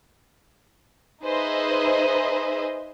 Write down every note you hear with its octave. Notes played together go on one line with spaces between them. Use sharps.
D#4 G#4 B4 C5 D#5 E5